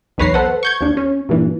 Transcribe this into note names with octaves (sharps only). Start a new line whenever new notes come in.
B1 E2 B4 C#5 A#5 C7
A4 B4 C5 F#5
C#6 G6 G#6
D#2 D4
C#4
G2 A#2 E3